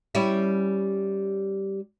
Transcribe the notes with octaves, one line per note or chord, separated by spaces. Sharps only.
G3 C#4 E4